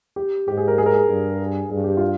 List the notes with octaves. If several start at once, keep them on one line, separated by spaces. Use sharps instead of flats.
G4
G#2 G4
G#4
A#4
G#4
A#4
G#4
G2
G2 G#4
G4
F4